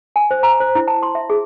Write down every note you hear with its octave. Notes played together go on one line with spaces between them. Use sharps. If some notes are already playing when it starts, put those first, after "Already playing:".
G#5
C5
A#5
C5
E4
A5
C6
E5
G#4